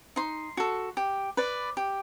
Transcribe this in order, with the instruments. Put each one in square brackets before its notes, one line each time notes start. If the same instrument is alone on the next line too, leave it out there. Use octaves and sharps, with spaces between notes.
[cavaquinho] D#4 C6
F#4 A4
G4
B4 D5
G4